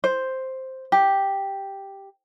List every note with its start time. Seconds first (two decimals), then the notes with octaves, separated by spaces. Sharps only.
0.04 C5
0.92 G4